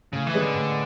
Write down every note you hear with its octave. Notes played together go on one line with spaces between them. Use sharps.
A2 C#3
E3
G#3 C#4 G#4 B4
D3
A2